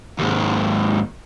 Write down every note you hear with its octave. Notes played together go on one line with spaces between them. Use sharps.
D#2 G#2